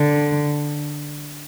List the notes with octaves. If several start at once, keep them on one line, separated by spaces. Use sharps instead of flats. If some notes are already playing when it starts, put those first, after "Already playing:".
Already playing: D3